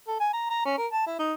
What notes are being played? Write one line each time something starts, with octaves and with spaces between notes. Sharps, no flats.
A4
G#5
A#5
A#5
C#4
A#4
A5
E4
D#4